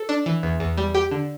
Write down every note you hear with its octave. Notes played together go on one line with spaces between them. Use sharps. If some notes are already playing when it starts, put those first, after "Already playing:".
Already playing: A4
D4
E3
E2
E2
G3
G4
D3